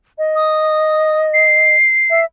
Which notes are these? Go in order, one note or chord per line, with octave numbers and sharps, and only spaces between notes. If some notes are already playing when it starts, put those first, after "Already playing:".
D#5
D#6
C7
E5